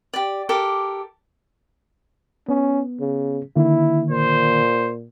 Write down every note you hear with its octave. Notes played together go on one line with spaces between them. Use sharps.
G4 D5
G4 A4 A#4 D6
B3 C#4
C#3
D3 D#3 A#3 E4
A#2 C5